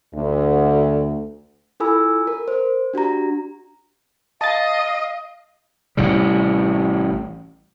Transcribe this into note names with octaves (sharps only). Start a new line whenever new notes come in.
D2
E4 F4 A4 G#5 B5 E6
A#4
C5
D4 F#4 G4 A#5
D#5 F5 A5 A6
A1 A2 C3 G3